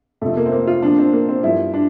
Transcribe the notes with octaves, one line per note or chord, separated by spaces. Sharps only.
F2 C3 F3 A3
A#3
C4
A#3
F4
A#2 F3 D4
C4
A#3
C4
G2 F3 E4
D4